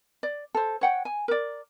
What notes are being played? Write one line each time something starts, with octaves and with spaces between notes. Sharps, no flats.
D5
A4 C5
C#5 F#5 G5
G#5
A#4 D5